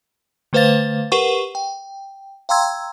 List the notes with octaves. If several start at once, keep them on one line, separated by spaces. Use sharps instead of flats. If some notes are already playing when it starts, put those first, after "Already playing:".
D3 A3 B4 C5 F5 A6
G4 A#4 B4 F#5 C#6
G5
F5 G5 A#5 C6 E6 G#6